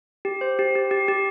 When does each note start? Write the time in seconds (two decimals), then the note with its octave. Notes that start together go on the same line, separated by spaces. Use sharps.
0.25 G4
0.41 C5
0.59 G4
0.75 G4
0.91 G4
1.08 G4